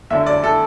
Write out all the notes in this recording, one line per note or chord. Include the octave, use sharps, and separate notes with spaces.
E2 D3 A3 E5
D5
D3 A3 A4